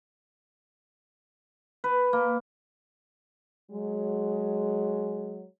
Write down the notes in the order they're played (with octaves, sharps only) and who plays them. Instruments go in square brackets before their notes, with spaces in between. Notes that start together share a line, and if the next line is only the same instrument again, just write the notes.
[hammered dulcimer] B4
A#3
[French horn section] F#3 G#3